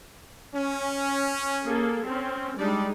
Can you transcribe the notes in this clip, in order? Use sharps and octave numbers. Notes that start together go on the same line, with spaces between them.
C#4
A#3 G#4 A4
C4 C#4
G3 G#3 D4 D#4 D5